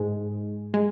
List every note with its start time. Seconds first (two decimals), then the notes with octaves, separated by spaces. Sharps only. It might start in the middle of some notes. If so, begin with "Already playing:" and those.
Already playing: G#2 G#3
0.74 G#3